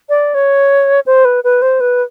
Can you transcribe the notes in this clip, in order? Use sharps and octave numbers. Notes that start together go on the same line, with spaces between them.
D5
C#5
C5
B4
B4
C5
B4